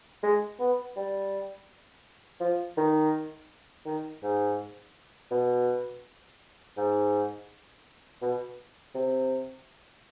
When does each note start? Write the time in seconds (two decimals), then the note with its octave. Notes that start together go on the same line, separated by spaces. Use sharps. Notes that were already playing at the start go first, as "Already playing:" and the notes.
0.23 G#3
0.60 B3
0.96 G3
2.40 F3
2.77 D#3
3.86 D#3
4.23 G#2
5.31 B2
6.77 G#2
8.22 B2
8.95 C3